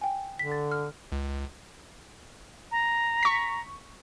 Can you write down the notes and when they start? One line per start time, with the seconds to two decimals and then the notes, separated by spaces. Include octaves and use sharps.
0.01 G5 G#5
0.39 D3 B6
0.52 A6
0.72 F6
1.12 C#2
2.71 A#5
3.23 C#6 B6